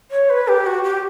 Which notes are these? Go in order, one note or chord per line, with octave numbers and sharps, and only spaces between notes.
C#5
B4
G4
F#4
G4